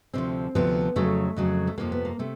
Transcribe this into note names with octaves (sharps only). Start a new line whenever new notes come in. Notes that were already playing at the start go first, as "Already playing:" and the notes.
D2 C3 F3 C4
D2 C3 F3 B3
F2 C#3 F#3 A3
F2 C#3 F#3
A3
F2 C3 F3 A#3
B3
A#3
C3 A3